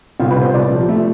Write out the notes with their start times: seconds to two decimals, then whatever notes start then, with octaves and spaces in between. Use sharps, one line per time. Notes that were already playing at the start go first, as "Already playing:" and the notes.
0.20 C2 F4
0.31 B4
0.36 C2
0.42 C5
0.54 C2 D5
0.71 F3
0.89 A3